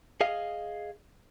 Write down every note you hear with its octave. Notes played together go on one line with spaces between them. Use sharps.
G#4 D#5 F5